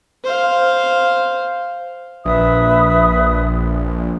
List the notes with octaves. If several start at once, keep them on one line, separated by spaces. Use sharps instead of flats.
C5 F5
A#1 B4 E5 D#6